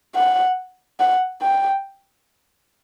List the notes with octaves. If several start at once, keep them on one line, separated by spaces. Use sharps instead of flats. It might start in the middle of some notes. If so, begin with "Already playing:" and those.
F#5
F#5
G5